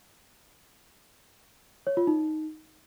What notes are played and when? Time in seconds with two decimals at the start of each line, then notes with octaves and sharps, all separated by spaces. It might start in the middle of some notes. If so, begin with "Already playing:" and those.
1.87 C#5
1.97 F4
2.07 D#4